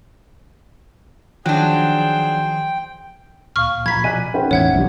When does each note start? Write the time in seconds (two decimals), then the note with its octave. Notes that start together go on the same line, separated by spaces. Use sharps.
1.46 D#3 F3 F#3 D4 G#4 C5 G5 F#6
3.56 D2 A#2 F5 C#6 F6
3.86 A#2 F3 A#5 B5 G#6 B6
4.04 B2 F3 D5 G#5 F#6 B6
4.34 C#4 D#4 B4 C5 F#5 G5
4.51 A1 E2 G#3 C#5 E5 F#5 G#6
4.74 B1 D3 G3